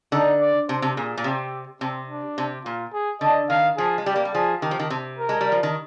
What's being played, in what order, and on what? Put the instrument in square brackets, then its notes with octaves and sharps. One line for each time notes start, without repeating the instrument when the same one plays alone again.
[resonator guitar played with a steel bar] D3 [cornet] D#4
[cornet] D5
[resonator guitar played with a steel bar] C3 [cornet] C5
[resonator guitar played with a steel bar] C3
[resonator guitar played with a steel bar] A#2 [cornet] G#4
[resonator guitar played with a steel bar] A#2
[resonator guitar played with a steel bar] C3 [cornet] G4
[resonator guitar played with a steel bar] C3 [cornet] C4
[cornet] D4
[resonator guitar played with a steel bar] C3
[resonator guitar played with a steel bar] A#2 [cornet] F4
[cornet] G#4
[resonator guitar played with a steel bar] D3 [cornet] D#5
[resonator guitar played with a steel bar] D#3 [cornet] F5
[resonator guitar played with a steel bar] F3 [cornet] G#4
[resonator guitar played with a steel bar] G#3
[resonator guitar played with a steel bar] G3 [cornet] G4
[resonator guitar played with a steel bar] A#3
G3
[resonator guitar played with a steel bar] F3 [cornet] G#4
[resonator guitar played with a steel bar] D#3 [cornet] G4
[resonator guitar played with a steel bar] F3
D#3
C3
[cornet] A#4
[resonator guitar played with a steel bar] G#3
G3
F3
D#3